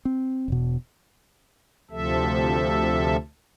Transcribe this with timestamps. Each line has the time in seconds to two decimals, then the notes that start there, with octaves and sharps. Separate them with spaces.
0.05 C4
0.48 E1 B2
1.91 D2 C3 F3 A4 E5